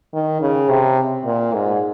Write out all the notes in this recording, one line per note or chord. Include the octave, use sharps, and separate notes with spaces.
D#3
C#3
C3
A#2
G#2